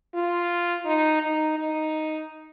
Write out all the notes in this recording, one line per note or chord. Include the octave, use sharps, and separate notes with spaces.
F4
D#4
D#4
D#4